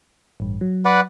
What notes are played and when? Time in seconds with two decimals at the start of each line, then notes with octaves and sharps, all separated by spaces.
0.40 A1 G2
0.61 F#3
0.85 B4 D5 F#5